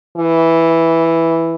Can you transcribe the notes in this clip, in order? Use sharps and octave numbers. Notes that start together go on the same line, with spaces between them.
E3